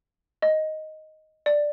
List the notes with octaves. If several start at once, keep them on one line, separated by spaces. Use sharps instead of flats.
D#5
D5